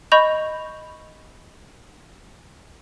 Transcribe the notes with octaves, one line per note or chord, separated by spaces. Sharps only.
D#5 B5 C#6 G6 F7